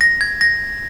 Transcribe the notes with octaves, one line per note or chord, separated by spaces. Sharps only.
A#6
G#6
A#6